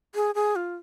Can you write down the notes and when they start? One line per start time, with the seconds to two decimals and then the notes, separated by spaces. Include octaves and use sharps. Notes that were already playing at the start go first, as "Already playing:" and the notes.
0.15 G#4
0.35 G#4
0.56 F4